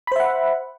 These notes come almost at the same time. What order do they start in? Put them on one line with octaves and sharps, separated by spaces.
B5 C5 E5 F#5